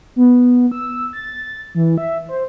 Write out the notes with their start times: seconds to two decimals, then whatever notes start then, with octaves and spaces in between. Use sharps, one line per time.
0.16 B3
0.72 E6
1.13 A6
1.75 E3
1.98 E5
2.29 C5